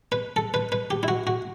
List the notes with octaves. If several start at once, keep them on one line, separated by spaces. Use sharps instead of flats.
B4
A4
B4
B4
G4
E4
F#4
F#4